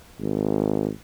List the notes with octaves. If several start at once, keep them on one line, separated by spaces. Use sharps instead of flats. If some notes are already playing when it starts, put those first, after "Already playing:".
G#1